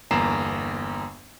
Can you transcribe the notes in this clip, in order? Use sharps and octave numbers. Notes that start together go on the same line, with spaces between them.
G1 E2 A#3 A#5 C7 E7